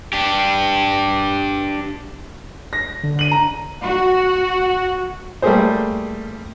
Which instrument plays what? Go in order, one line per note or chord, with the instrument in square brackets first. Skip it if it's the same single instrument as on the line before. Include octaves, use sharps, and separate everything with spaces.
[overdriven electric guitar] D4 G4
[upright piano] A#6
[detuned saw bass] D3
[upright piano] D#7 F#7
A#5
[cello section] F#4
[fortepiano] G3 A3 A#3 G4 G#4 C5